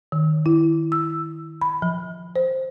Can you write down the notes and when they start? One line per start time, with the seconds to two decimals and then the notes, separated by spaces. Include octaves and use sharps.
0.12 D#3
0.46 E4
0.92 E6
1.61 B5
1.82 F3
2.36 C5